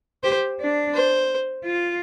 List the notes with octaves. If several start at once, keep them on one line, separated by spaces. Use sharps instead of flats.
G4 C5
D4
C5
F4